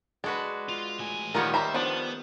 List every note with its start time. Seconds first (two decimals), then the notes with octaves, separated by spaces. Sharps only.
0.24 G#3 D4 F#4 B4
0.69 F4
0.99 A2 G#5
1.34 D#3 G3 B3 F4 A#4 C#5
1.54 G3 C5 E5 A#5 B5
1.74 F3 B3 D4